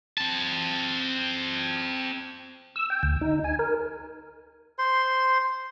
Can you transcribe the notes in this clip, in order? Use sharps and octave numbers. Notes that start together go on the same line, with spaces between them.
C4 A5
E6
G5
D2
D#4
G#5
A#4
C5 C6